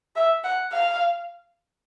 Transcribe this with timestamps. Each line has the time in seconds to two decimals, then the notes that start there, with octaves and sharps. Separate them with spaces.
0.16 E5
0.44 F#5
0.72 F5